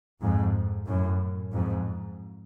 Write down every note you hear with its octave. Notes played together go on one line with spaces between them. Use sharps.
F2 G#2
F#2 A2
F2 G#2